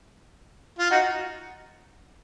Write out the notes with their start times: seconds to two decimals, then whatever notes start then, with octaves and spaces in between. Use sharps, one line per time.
0.79 F4
0.91 D#4 F#4